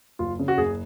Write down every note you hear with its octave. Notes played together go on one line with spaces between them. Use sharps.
F#1 F4
C#3
F#4
F#1 G#4